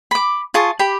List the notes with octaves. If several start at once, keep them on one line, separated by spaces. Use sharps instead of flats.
B5 D6
F4 G#4 A5 C#6
G4 B5